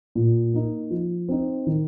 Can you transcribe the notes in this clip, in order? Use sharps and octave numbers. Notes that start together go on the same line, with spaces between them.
A#2
A#3 D#4
F3
C4 D#4
D#3